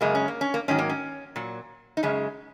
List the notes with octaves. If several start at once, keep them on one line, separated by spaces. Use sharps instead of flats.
F#2 C#3 G#3 A#3
C#4
A#3
C#4
A#3
G#2 D#3 F#3 C#4
A#3
C#4
A#2 F#3
D#4
F#2 C#3 G#3 C#4